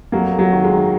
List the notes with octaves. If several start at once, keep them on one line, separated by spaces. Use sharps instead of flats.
F2 F#3 A#3
F2
F#3
D#3
G#3
D#3